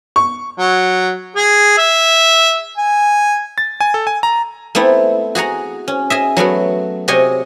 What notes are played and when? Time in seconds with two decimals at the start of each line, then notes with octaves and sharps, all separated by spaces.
0.16 C#6
0.58 F#3
1.36 G#4
1.78 E5
2.78 G#5
3.58 A6
3.80 G#5
3.94 A4
4.07 G#5
4.23 A#5
4.75 A3 B3 C4 E4
5.35 F#4 G#4 F#5 A#5
5.88 C#4
6.10 G#4 D#5 E5
6.37 F#3 A3 B3 F#4
7.08 C3 F#4 G#4 C#5 D#5 G#5